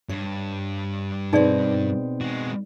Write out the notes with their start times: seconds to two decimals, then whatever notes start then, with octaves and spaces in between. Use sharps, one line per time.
0.09 G2 C#5
1.33 B2 C4 D#4 G#4 D5
2.21 G#3 F#4